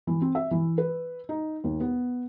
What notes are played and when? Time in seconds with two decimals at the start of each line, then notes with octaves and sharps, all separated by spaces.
0.07 E3
0.22 C4
0.35 E5
0.51 E3
0.78 B4
1.29 D#4
1.64 D#2
1.80 B3